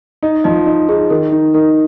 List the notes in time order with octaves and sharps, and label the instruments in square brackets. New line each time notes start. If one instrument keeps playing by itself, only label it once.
[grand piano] D#4 [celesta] D#5
[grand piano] F3 [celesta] D#5
[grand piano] D#4
[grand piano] D#4 [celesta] G#4
[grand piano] D#3 [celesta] A#4
[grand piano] D#4
[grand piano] D#4 [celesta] A#4